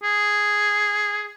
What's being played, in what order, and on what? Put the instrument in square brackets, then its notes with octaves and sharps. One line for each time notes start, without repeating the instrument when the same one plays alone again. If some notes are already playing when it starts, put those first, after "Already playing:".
[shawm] G#4